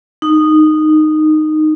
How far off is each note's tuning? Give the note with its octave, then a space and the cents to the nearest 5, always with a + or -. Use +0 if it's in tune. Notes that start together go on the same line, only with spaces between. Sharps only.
D#4 -10